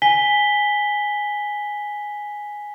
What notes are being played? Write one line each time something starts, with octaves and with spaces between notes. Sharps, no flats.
G#5 B6 G7